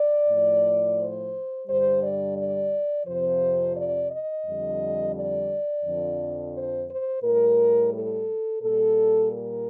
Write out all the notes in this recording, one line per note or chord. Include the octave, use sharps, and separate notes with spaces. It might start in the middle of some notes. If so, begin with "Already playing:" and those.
Already playing: D5
A2 F3
C5
G2 D3 G3 C5
D5
D5
F2 C3 F3 C5
D5
D#5
F2 D3 G3
D5
F2 D3 F3
C5
C5
A2 G3 A#4
A4
A#2 G3 A4
A#4